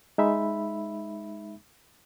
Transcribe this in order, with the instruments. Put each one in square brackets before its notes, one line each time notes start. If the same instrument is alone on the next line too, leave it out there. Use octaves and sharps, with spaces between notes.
[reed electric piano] G#3 D#4 E5 B5